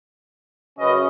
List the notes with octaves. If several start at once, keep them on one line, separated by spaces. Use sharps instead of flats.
F#2 C#3 F#3 C#4 B4 D#5